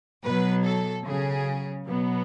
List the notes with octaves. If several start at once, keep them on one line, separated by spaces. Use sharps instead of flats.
B2 F#3 B4
A4
C#3 F#3 G#4
B2 F#3 B3